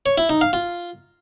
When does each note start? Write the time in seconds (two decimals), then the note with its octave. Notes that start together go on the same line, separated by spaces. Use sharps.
0.06 C#5
0.18 E4
0.29 D#4
0.41 F5
0.53 F4